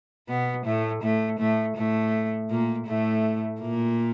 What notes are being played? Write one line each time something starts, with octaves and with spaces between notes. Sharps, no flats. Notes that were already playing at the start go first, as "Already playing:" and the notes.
B2 B3
A2 A3
A2 A3
A2 A3
A2 A3
A#2 A#3
A2 A3
A#2 A#3